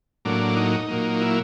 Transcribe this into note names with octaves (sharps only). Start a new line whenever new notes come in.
A2 F#3 A#3 D4
D#4
A#2 F#3 A#3
E4